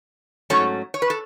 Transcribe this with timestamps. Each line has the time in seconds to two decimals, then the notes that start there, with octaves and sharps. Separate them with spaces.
0.50 G#2 F#3 A3 C#4 A4 C#5
0.94 C#5
1.02 B4
1.10 A4